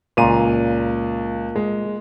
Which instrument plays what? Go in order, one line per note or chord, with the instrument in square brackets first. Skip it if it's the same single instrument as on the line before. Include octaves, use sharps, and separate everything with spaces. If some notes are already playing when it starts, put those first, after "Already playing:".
[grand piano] C#2 F5 D#7 [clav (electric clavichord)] A#2
[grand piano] G#3